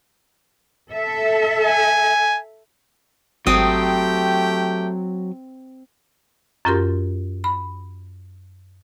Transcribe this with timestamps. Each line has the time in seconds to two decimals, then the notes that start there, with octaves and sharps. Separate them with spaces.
0.91 A4 E5
1.65 G#5
3.47 G#1 F#3 A3 C4 G4 G5 D#6
6.65 F#2 C#4 F4 G4 A#4 C6
7.44 B5